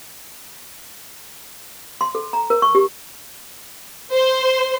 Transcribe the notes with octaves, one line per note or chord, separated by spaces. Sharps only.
C6
A4
A#5
A#4
C#6
G4
C5